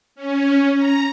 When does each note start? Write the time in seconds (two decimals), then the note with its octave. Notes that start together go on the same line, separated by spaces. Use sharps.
0.15 C#4
0.76 A#5